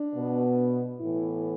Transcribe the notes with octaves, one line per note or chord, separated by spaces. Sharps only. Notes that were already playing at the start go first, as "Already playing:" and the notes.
Already playing: D4
B2 B3
A2 E3 B3 E4